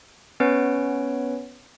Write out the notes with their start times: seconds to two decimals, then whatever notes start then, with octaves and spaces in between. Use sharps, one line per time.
0.40 B3 C#4 B4 C#5 D7